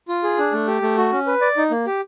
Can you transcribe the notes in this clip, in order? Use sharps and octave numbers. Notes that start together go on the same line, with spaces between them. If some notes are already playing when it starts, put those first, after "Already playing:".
F4
G#4
D4
A3
G4
A3
F#4
C#4
B4
D5
D#4
A#3
G4